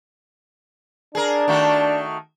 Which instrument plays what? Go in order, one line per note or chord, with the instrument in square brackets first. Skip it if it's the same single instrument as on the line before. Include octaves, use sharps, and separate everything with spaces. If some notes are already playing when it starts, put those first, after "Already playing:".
[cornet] D4 [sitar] G#4 A#4
[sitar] D#3 A3 F#4